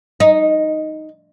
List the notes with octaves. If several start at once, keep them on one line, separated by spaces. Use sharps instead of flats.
D#4